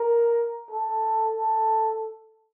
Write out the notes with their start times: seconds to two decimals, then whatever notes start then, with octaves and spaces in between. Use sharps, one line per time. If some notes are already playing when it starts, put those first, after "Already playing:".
Already playing: A#4
0.71 A4
1.35 A4